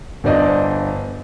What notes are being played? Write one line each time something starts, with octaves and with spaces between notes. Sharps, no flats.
G1 D4 C5 D5 D#5